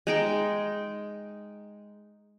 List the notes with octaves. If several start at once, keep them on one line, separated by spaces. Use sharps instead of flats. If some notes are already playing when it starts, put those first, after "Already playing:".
G#3 D#4 G5